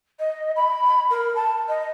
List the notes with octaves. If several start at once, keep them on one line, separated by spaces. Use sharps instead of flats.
D#5
B5
A#4
A5
D#5